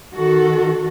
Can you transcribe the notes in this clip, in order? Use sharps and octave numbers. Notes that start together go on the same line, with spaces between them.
D#3 F#4 A4